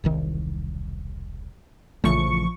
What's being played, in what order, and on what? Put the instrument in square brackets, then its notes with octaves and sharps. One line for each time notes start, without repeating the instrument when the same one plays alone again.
[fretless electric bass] E1 C2 D#3
[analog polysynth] A#1 F3 C#6 [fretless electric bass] C#3 E3 A3